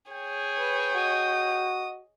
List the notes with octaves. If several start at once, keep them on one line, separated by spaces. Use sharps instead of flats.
G#4 C#5 G5
B4
F#4 D#5 D#6